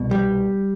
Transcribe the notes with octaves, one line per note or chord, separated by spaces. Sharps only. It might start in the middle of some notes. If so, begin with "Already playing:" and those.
Already playing: C2 B2
G3